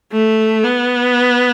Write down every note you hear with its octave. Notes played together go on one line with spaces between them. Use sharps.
A3
B3